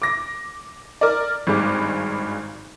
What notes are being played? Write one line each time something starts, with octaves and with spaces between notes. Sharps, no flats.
D6 A#6
A#4 D5
G#1 G2 G#3 D6